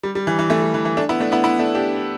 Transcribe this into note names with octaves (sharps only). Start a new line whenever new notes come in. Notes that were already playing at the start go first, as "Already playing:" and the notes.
G3
G3
E3
E3
E3 A3
G3
E3
E3
A3 D4
B3 E4
A3 D4
B3 E4
B3 E4
A3 D4
D4 G4